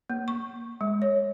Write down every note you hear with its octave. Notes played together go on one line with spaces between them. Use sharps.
A#3
C#6
G#3
C#5